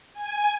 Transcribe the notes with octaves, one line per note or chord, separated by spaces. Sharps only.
G#5